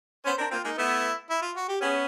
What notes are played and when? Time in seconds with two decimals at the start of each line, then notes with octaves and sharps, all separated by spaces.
0.25 B3 C#4 C5
0.38 C4 D4 A#4
0.51 A#3 C4 F4
0.64 G#3 A#3 D#4
0.77 A3 B3 E4
1.30 E4
1.42 F4
1.56 F#4
1.68 G4
1.81 B3 C#4 G#4